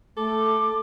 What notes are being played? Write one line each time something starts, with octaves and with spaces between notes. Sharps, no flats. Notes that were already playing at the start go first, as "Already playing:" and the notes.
A3 A4 D6